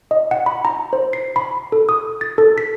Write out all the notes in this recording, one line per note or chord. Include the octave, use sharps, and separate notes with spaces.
D#5
F#5
B5
A#5
C5
C7
B5
A4
D#6
A6
A4
B6